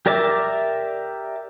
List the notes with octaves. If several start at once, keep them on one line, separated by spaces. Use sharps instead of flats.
G4 A#4 D5 E5 D6